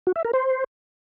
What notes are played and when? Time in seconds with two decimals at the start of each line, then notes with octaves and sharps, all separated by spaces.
0.07 F#4
0.16 E5
0.25 A#4
0.33 C5